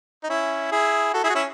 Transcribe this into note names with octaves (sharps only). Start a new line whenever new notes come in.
D#4
C#4 E4
E4 G#4
F#4 A4
E4 G#4
F#4
C#4 E4